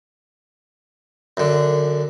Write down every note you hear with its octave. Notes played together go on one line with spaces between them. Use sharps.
F#2 D3